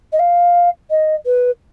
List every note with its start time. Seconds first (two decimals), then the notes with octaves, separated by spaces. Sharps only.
0.12 D#5
0.19 F5
0.90 D#5
1.26 B4